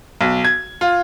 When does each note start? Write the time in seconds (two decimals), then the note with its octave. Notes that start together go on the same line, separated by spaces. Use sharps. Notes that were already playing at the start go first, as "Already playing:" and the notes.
0.21 B1
0.45 G#6
0.81 F4